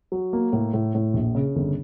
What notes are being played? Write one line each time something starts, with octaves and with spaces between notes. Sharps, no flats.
F#3
A#3
A2
A2
A2
A#1
C#3
G1